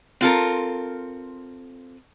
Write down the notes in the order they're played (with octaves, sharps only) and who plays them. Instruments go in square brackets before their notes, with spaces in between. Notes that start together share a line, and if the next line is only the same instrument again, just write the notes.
[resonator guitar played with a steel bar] C4 F4 A4 A#4